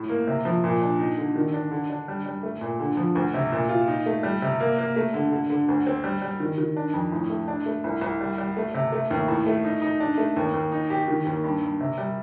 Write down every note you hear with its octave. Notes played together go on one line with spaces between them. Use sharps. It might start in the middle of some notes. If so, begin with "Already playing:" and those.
Already playing: A2
A#3
C3
F3
A#2
D4
D#4
D3
D#3
D4
D3
D4
G3
G3
A3
A#2
D3
F3
D2
C3
A#2
F4
D#4
A3
G3
C3
A#3
A#3
A3
D3
D3
D3
D2
C4
G3
G3
D#3
D#3
D4
F2
A2
A3
D4
A3
C2
C2
G3
G3
A3
C3
A3
D#2
A2
A3
D#4
D#4
D4
A3
D#2
D#2
D#4
G4
D#3
D#2
G2
G2
C3
G3